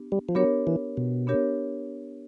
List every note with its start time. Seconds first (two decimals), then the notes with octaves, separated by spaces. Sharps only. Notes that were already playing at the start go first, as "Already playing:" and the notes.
Already playing: B3 D4 G4
0.12 G3
0.29 F3
0.35 F#3 B3 D4 G4 A#4 C#5
0.67 E3
0.97 B2
1.27 B3 D4 G4 A#4 C#5